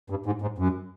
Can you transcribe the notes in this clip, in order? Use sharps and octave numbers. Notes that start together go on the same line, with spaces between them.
G2
G#2
G#2
F#2